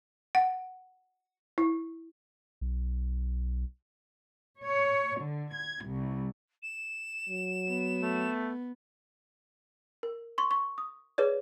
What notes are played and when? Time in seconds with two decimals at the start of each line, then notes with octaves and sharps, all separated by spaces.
0.35 F#5
1.58 E4
2.61 B1
4.62 C#5
5.21 D3
5.54 G#6
5.84 C2
6.63 E7
7.29 F#3
7.68 B3
8.02 A3
10.03 A#4
10.38 C6 C#6
10.51 C#6
10.78 D#6
11.18 G#4 B4 C#5 D5